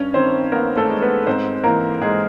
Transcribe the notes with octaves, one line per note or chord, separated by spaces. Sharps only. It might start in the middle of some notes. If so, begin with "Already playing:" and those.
Already playing: G2 C#4 C#5
D#3 C4 C5
A#3 B3 A#4
A3 A4
G#3
B3 B4
G#2 C4 C5
E3 A#3 A#4
G#2 G#3 G#4